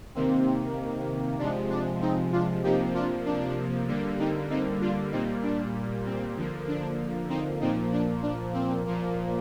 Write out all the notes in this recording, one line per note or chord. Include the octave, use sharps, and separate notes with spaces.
C3 D#3 A#3 C4
C3 F3 G#3 D4
D4
C4 D#4
D4 F4
C3 F3 A#3 D#4 G4
D4 F4
D4
D3 G3 A#3
C4 D#4
C4 D#4
D4 F4
A#2 G3 A#3 C4 D#4
D4
C4
D3 F3 A#3
D4
C4 D#4
A#2 F3 A#3 C4 D#4
D4
D4
C4
A#2 F3 A#3